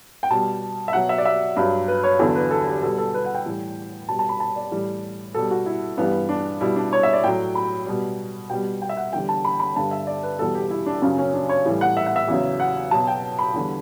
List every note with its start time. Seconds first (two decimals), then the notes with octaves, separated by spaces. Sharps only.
0.23 G5
0.30 B2 G3 A5
0.88 E5
0.93 B2 F#3 F#5
1.09 E5
1.18 D5
1.25 E5
1.56 G2 F#3
1.88 B4
2.04 C#5
2.19 E2 D3 F#3 A4
2.35 B4
2.51 A4
2.67 G4
2.82 B2 G3 A4
2.98 A4
3.14 B4
3.25 F#5
3.35 G5
3.46 A2 E3 G3
4.08 B2 G3 A5
4.19 A5
4.29 B5
4.40 A5
4.56 D5
4.72 A2 E3 G3
5.34 B2 G3 A4
5.51 F#4
5.66 E4
5.97 G2 E3 G3 B3
6.29 D4
6.61 B2 G3 E4
6.76 D4
6.93 C#5
7.03 E5
7.13 D5
7.24 A2 F#3 G5
7.55 B5
7.86 B2 G3
8.50 B2 G3 G5
8.82 G5
8.89 E5
8.97 F#5
9.13 E2 D3 G3 G5
9.29 A5
9.45 B5
9.60 B5
9.76 G2 D3 G3 A5
9.91 E5
10.07 D5
10.23 B4
10.39 E2 B2 G3 A4
10.55 G4
10.70 E4
10.86 D4
11.02 F#2 C#3 F#3 C#4
11.18 C#4
11.34 D4
11.49 C#5
11.65 A2 E3 G3
11.81 F#5
11.97 E5
12.06 F#5
12.16 E5
12.28 E2 C#3 F#3
12.60 F#5
12.91 B2 F#3 A5
13.07 G5
13.39 B5
13.54 E2 D3 G3